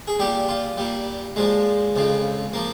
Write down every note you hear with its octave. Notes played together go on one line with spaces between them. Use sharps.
G#4
A#2 G3 G4
F4
A#2 G3
A#2 F3 G#3
F2 C#3 F3
F3 A#3